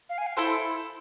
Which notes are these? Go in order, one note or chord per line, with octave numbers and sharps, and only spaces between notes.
F5
G#5
F5
E4 A4 C5